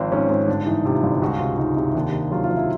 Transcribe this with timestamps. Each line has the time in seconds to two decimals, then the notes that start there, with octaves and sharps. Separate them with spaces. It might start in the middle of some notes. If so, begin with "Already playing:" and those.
Already playing: G#1 F3 C4
0.12 G#2 C#4
0.29 G#2 C4
0.48 G1 D4
0.66 E3 D#4
0.85 C3 F4
1.03 G1
1.22 C#2 F#4
1.40 C3 F4
1.58 C#2 D#4
1.76 C3 E4
1.95 D#2 D4
2.13 D#3 D#4
2.31 F#3 F4
2.44 F4
2.51 F#3
2.56 E4